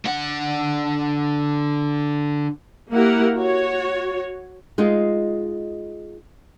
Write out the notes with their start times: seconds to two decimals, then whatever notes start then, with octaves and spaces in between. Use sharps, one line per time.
0.06 D3 F#5
2.91 A#3 E4 G4 A#4 F#5
3.35 F#4 C#5
4.78 G#3 D#4 F4